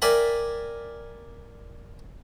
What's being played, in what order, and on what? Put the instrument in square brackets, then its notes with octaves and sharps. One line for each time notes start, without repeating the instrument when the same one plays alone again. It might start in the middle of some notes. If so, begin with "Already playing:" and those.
[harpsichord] A#4 D5 E5 G5 G#5 B5